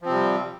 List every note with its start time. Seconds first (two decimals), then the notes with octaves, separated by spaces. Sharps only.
0.02 F3
0.05 C4
0.09 C3
0.12 G3